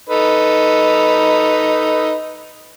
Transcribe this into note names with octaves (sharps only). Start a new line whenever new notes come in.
D#4 A4 B4